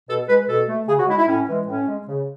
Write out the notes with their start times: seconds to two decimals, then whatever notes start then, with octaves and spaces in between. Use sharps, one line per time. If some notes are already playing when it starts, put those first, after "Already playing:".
0.08 B2 A4
0.27 G#3 B4
0.48 B2 A4
0.68 A3
0.87 C#3 G#4
0.98 F#4
1.07 G#3 E4
1.17 E4
1.27 A2 C#4
1.48 E3 G#3
1.67 A2 C#4
1.88 G#3
2.08 C#3